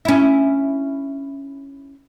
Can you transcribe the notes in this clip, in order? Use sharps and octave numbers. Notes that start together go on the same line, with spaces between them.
C#4 E4